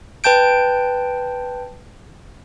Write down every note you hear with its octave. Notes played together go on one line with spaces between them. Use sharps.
B4 G5 A5 G6 D7